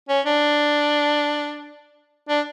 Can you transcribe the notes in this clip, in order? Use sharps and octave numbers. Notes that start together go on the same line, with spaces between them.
C#4
D4
D4